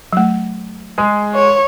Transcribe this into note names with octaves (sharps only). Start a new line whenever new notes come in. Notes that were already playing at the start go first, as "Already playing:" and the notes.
F#3 A3
G#3 G#4
C#5